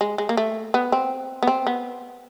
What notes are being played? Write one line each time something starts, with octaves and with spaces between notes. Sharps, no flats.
G#3
G#3
A#3
A3
B3
C4
B3
C4
B3